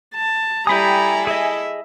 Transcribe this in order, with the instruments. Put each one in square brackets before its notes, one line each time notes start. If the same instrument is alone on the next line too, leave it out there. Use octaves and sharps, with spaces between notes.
[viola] A5
[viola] G3 A#5 [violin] E4 A4 [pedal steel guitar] G5 B5 D#6 [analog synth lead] G#5
[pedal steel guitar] G#4 D#5 [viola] E5